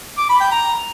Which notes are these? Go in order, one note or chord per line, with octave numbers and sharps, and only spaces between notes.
D6
B5
G5
A#5